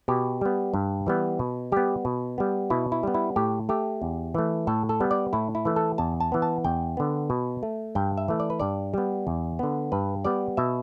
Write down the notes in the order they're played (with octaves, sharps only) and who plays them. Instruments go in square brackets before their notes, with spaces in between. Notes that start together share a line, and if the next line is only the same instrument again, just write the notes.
[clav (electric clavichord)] B2 G4
G3 B3
G2
E3 G3 B3
B2
G3 B3 G4
B2
G3 B3
B2 E4
E4
G3 B3
E4
A2 G4
A3 G4
E2
E3 A3
A2 A4
A4
G3 B3
D5
A2 E4
E4
E3 A3
A4
E2 A5
A5
E3 B3
A5
E2 G5
D3 B3
B2
A3
G2 G5
E5
E3 A3
D5
B4
G2 D5
G3 B3
E2
D3 B3
G2 B4
G3 B3 D5
B2 E5